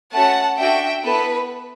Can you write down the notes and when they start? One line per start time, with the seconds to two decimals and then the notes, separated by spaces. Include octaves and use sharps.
0.13 A3 C#4 F#4 F#5 A5
0.58 D4 F#4 A4 E5 G5
1.04 B3 E4 A4 B4